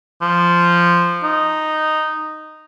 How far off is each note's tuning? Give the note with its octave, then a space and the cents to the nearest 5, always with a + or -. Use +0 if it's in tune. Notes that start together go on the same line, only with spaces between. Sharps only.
F3 -5
D#4 -5